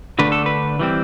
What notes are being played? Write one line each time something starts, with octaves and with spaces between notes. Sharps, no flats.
D3 A3 D4 B4
A4
B4
E3 G3 C4